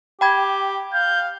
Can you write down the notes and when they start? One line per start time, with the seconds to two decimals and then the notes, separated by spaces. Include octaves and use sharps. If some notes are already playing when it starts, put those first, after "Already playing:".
0.21 G4 G5 B5 G#6
0.93 F5 G6